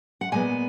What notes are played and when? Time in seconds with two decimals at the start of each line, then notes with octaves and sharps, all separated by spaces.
0.21 F#5
0.32 A#2 G#3 B3 G#5